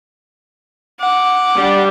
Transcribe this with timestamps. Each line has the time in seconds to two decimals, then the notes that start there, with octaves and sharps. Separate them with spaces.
1.00 F#5 D6
1.57 G3 D4 G4